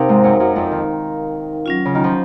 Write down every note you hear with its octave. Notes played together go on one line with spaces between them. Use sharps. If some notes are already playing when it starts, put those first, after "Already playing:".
Already playing: C3 C4 D#4 A#4 F5
G#2 G#3
F#2 F#3
F#2 F#3
F2 F3
D#3
F#3 C#4 F4
C#3
D#3
F3